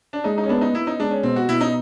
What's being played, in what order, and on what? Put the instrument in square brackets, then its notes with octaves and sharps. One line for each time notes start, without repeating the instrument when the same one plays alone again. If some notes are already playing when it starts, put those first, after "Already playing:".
[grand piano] D4
[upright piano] G#3 [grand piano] D#4
[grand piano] D#4
C#4
[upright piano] B3 [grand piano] D4
[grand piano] D#4
[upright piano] B3 [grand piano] E4
[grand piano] D#4
[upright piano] G#3 [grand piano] D4
[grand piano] C#4
[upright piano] B2 [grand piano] C4
[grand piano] F#4
[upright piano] B2 [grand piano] E4
[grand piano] D#4